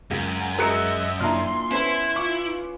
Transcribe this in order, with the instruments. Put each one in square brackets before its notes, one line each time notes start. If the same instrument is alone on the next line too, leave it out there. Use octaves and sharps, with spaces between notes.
[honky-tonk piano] C#2 [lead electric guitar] F#2
[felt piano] G#3 A#4 [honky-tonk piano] F#4 F#6 C#7 [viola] D#5 E5
[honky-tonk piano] A#2 D4 E4 [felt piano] A#5 F6 [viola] C6
[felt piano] B3 C5 [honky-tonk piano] C#4 B4 [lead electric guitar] E4
[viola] F4 [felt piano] C#6 D6